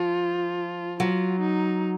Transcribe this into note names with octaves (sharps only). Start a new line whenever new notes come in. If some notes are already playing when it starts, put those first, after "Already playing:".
Already playing: F3 F4
F#3 F4
D#4